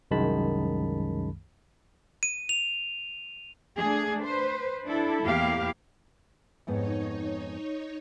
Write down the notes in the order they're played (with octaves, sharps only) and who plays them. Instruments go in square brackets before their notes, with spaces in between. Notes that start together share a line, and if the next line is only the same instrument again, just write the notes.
[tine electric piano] C2 F#2 D#3 G#3 A5 B5
[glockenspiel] D#7
F7
[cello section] A3 D4 G#4
B4 C5
D4 E4 A4
E2 A2 A#3 E4 G4 F5
[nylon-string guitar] F2 G#2 B3 [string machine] D#4 C#5